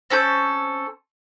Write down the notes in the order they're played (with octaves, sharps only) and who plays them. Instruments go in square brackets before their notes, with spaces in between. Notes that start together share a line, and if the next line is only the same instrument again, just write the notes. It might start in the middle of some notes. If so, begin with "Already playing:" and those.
[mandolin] C4 C#4 A4 G6